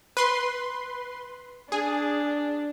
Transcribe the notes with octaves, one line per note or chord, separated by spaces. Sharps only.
B4 C6
D4 G#4